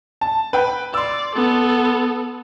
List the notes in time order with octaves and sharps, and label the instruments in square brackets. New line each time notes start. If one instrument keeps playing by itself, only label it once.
[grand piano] A5
B4 G5 B5
[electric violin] D5 [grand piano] C6 E6
[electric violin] B3 A4